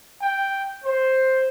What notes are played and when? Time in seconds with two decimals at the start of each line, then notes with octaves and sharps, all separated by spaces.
0.21 G5
0.84 C5